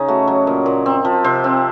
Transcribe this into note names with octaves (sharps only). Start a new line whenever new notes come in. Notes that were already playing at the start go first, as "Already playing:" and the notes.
Already playing: C#3 C#4 D#4
A3 F#4
F#3
A#2
A#2
C4
F3
C3 C5
C4